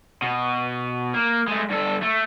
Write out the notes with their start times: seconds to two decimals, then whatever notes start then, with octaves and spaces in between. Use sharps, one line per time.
0.22 B2
1.14 A#3
1.48 G#3 A3
1.70 G2 A4
2.02 A3